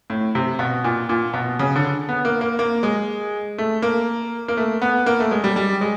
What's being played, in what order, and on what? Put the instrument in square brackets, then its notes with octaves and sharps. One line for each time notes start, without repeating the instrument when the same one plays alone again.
[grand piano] A2
C3
B2
A#2
A#2
B2
C#3
D3
B3
A#3
A#3
A#3
G#3
A3
A#3
A#3
A3
B3
A#3
A3
G#3
G3
G3
G#3